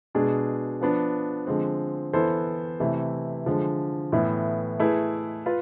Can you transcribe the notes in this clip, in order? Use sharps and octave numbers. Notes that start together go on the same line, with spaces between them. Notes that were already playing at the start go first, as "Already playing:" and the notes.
B2 G#3 D4 G#4
F3 B3 D4
D3 F3 G#3 C4
E3 B3 E4 A4 C5
C3 E3 A3 E4
D3 F3 G#3
A2 E3 B3 E4
A3 E4 G#4 B4
F4 B4